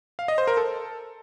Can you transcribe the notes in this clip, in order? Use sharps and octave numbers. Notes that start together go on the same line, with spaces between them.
F5
D#5
C5
A#4
A4